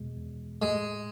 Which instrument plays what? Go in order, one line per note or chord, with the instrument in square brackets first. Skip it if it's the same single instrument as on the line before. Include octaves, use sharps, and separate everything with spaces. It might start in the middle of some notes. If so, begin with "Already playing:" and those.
Already playing: [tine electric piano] E2 B2 G#3
E2
[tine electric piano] A2 [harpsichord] G#3